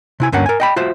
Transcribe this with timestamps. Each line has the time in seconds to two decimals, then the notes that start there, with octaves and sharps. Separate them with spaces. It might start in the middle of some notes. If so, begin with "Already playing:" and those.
0.20 C3 E4 G#5
0.32 D2 G2 A#3 C#4 F#5
0.46 A#4 G#5
0.60 D#5 G5 B5
0.76 F4 F#4 C5 E5